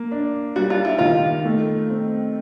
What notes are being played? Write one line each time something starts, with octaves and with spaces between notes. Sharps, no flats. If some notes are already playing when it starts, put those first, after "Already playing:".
Already playing: A#3
D4
G3 F#4
F4
E4
D#3 F4
A3
C4